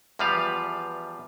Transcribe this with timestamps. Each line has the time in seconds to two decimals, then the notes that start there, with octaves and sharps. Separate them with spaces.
0.19 E2 F3 G3 B4 F5